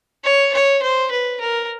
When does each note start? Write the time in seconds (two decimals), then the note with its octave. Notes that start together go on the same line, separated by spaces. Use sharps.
0.24 C#5
0.53 C#5
0.83 C5
1.11 B4
1.41 A#4